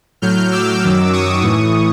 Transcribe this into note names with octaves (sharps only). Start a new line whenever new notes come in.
A2 F#3 F6 G6
D6 E6
F#2 D#3 F#3
C#6 D#6
A2 E3